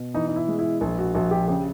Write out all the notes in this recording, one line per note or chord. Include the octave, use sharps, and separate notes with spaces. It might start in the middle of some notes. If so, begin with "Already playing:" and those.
Already playing: B2
E3 D#4
D#4
E4
G#3
E4
A#1
F#4
A#1 F#4
G4
C#3 G4